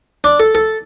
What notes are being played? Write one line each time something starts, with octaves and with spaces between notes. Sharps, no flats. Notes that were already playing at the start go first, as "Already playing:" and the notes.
D4
A4
A4